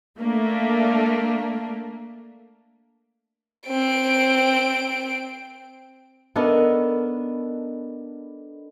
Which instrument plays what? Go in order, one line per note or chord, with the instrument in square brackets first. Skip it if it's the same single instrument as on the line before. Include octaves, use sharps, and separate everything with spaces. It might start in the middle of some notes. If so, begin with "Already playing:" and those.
[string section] A3 A#3 D4
[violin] C4 D7
[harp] B3 D4 A4 A#4 D#5